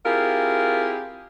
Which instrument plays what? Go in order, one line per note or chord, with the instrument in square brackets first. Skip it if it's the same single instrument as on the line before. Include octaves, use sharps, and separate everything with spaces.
[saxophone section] C4 E4 F4 G4 G#4 A#4